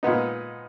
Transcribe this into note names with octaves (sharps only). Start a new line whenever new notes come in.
A#2 G#3 B3 D#4